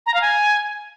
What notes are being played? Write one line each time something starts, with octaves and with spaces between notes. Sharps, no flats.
A#5
F5
G#5